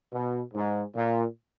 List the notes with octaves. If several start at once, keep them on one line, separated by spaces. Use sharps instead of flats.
B2
G#2
A#2